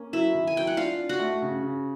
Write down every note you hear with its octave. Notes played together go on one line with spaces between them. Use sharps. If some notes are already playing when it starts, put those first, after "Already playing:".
Already playing: A#3 C#4
F#3 E4 E5
D#3
G#5
F#3 G5
F#5
D4 F4 F5
D4
F#4 F#5
A3
C#3
C#3